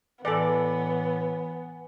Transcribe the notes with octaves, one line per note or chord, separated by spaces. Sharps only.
A2 E3 B3 A4 B4 D5 G#5